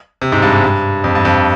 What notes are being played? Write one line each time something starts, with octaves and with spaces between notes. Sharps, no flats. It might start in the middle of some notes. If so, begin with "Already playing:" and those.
C3
G#2
G2
G#2
G2
F2
G2
F2